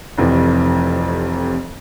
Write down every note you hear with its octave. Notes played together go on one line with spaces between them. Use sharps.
F1 F2 C3 E3